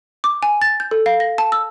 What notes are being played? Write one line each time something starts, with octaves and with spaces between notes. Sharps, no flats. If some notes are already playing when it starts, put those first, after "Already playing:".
D6
G#5
A6
G6
A4
F5
A#6
A5
E6